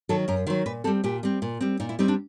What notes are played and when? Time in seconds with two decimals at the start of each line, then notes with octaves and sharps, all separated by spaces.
0.09 D#3 F#3 A4
0.28 F#2 A#4
0.47 D#3 C5
0.50 F#3
0.66 A#2 B4
0.84 G3 C4 A4
1.04 A#2 G4
1.23 G3 C4
1.42 A#2
1.61 G3 C4
1.80 A#2 D#4
1.89 E4
1.99 G3 C4 D#4
2.08 D4